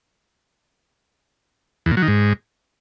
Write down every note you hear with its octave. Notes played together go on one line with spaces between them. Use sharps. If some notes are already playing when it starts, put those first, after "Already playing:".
E2
A#2
F#3
D#3
G#2